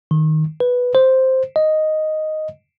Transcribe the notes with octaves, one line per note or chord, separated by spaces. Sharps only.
D#3
B4
C5
D#5